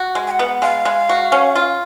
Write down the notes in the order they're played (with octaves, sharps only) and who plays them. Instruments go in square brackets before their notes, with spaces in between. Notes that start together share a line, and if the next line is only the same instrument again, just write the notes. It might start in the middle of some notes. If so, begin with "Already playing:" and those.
Already playing: [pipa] F#4
G#3
[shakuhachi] G#5
F#5
[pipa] B3
[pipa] G#3 [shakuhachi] F5
[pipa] G#3
F#4
C#4
F4